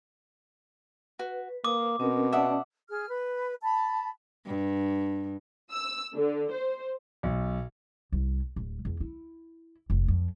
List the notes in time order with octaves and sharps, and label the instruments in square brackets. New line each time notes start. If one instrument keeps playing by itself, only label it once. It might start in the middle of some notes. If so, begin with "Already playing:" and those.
[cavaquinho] F#4 [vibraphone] B4
[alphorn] A#3 [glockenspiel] D6 [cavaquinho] D#6
[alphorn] B2 [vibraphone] C4 C#4 A#4
[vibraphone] C#4 D5 A5 [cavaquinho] E5 F#5 D#6
[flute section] G#4 F6
B4
A5 B5
[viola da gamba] G2
[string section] E6
D3
C5
[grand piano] B1
[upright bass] C2
D1
E2
E4
F1
F2